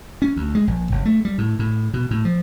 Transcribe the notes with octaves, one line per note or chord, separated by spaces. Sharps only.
C#4
D2
G#3
A#1
F#1
A3
G3
A2
A2
B2
A2
F3